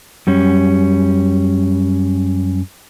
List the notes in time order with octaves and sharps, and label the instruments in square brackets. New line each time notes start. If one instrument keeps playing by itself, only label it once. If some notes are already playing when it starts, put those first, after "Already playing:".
[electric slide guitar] F#2 G3 C#4